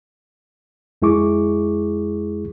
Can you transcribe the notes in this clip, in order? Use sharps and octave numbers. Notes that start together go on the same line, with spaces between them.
F2 G#3 E4 G#4 C#6 D6